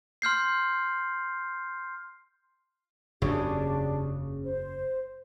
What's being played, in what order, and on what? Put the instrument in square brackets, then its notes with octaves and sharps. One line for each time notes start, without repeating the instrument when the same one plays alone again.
[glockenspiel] C6 F6 G6 C7
[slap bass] F#1 E2 [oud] C#3 [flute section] D4 G4
[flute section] C5